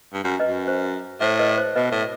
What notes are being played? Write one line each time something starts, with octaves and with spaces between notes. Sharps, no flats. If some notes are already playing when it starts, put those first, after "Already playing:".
G2
F#2
B4 D#5
F#2
C5
A2 C5 E5
B4 D#5
C5
B2 B4 D#5
A2